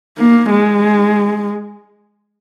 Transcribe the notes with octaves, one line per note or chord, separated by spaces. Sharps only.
A#3
G#3